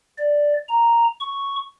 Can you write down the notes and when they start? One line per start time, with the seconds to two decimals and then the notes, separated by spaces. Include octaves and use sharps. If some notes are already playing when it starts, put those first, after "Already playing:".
0.18 D5
0.69 A#5
1.20 C#6